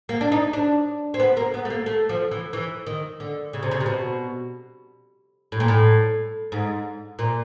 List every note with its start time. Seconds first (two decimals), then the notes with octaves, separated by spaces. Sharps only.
0.09 A#3
0.21 D4
0.32 D#4
0.53 D4
1.14 C4
1.19 B3
1.37 A#3
1.54 B3
1.65 A3
1.70 A#3
1.86 A3
2.09 F3
2.31 E3
2.53 E3
2.87 D#3
3.20 D3
3.53 C#3
3.63 C3
3.71 C#3
3.80 C3
3.86 B2
5.52 A2
5.60 A#2
5.68 A2
6.52 G#2
7.19 A#2